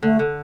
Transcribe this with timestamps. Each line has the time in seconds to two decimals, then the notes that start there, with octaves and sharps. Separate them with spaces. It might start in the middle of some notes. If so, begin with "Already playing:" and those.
0.03 D3 A3
0.19 D3